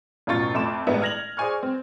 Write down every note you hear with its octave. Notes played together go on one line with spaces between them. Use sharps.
A1 F#2 B2 F4 C#6 A6
F2 A3 C6 D6 E7
A1 G2 G#3 B3 A#4 E5
F6 G#6 A#6 F7 F#7
G#4 C5 D5 G#5 C#6 F6
C4